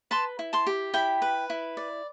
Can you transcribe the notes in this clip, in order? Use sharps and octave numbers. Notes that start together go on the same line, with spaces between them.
B4 A5 C6
E4
A5 C6
G4
E4 G5 B5
B4
E4
D5